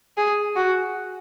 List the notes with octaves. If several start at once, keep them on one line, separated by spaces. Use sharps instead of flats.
G#4
F#4